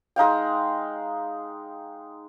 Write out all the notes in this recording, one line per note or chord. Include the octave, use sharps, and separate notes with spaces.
G#3 D#4 F5 G5